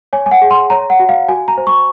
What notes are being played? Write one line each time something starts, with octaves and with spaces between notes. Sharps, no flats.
C#5 G#5
G#5
F#5
G#4
C6
C#5 A#5
F#5
F#4
F5
F#4 G#5
A#5
C5
C#6